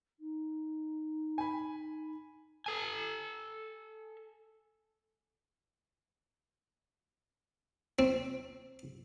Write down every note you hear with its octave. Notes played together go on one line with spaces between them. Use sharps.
D#4
G#5 B5
A4 G#5
C4